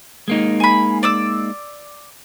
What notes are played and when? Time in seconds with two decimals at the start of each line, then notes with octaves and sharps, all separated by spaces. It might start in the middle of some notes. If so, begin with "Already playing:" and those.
0.28 G#3 A#3 D#4
0.60 G#5 B5
1.03 D5 D6 E6